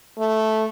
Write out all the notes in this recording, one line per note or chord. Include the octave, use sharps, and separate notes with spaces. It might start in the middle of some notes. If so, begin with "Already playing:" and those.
A3